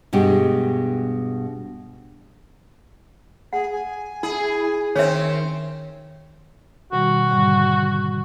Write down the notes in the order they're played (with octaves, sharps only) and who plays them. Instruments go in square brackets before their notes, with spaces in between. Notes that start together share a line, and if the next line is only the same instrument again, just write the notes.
[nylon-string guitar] G2 B2 G#3 G4
[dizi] G#4 [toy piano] F#5
[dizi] G#5
[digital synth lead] E4 [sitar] G#4
[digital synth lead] D#3 [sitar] C4 C#4 [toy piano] C#5 E5
[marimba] B2 D#3 G3 [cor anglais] F#4
[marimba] G#2 D3 G3